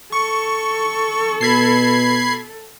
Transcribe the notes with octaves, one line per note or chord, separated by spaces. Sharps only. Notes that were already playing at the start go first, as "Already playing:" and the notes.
A4 C#6
B2 B5 G#6 C7